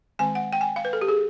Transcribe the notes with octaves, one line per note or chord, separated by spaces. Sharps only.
D#3 G#3 C4 G#5
F#5
G5
G#5
F5
B4
A4
G4
G#4